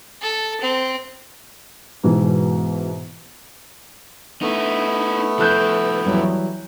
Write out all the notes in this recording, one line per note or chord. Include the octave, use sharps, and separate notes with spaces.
A4
C4
G#2 B2 E3
A3 B3 D#4 E4
F3 E4 A4 F#6 G6
E3 F#3 G3